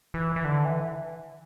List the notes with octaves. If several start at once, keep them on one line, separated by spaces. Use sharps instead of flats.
E3
E3
D3
E3